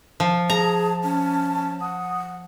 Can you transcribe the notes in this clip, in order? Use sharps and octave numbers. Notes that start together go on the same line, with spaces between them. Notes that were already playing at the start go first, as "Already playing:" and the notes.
F3
G#4 A5 A#5
C#4
F#5 D#6